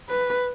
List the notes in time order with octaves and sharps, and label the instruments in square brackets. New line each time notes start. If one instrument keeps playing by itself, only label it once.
[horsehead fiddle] B4